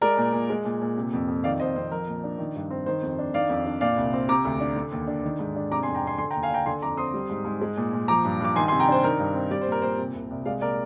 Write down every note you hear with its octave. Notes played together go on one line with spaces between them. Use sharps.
G#3 A#4 D5
A#2
A#2
G#3
A#2
A#2
C3
F2
F2
D#3 D5 F5
F2 C5 D#5
F2 C5
F3 A#4
A#2
D4
D#3
G2
C4
D#3 C5
F2
D4
D#3 D5 F5
F2
D4
A#2 D5 F5
C2
C4
C3 A#5 D6
D2
D4
D3
D#2
D4
D#3
G#2
D4
C3 A#5 D6
G#5 C6
F2
G5 A#5
F2 G#5 C6
D3 G#5 C6
G5 A#5
D#2
F5 G#5
D4 G5 A#5
D3 G#5 C6
F2 A#5 D6
C4 C6 D#6
G3
G#2
G#2
G#3
A#2
A#2
F3 A#5 D6
G2
G2 D6
D#3 G#5 C6
G#5 C6
C3
G5 A#5
D4 C5
D#3 A#4
G2
C4
G3 D5
C5
A#2
A#4
A#2 C5
C3
C2
C2
G#3 D5 F5
A#2 A#4 D5